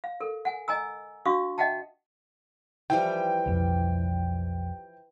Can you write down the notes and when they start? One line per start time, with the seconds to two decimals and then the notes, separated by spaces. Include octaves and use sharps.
0.04 F5
0.20 A4 A#4
0.45 F#5 G#5
0.68 D#5 G#5 A#5 E6
1.25 D4 F#4 F5 C#6 D#6
1.58 D#5 E5 F#5 G5 A5
2.90 E3 F3 G3 G5
3.46 B1 F2